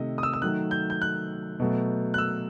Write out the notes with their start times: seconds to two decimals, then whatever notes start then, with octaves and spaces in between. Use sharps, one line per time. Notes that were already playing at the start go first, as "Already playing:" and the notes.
Already playing: C3 D#3 A3 D#5
0.18 D#6
0.23 E6
0.33 E6
0.42 D#3 F#3 A3 F#6
0.71 G6
0.90 G6
1.02 F#6
1.59 B2 F#3 A3
2.14 F#6
2.18 E6